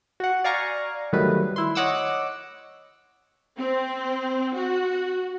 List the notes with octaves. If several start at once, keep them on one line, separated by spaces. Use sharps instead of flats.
F#4 F#5
D5 F5 G#5 A#5 C#6
D#3 F#3 G3 A3 B4
E4 C6
C#5 D#5 F#5 D6 E6
C4
F#4